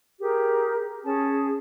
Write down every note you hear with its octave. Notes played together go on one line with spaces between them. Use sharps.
G4 G#4 A#4
C#4 G#4 A5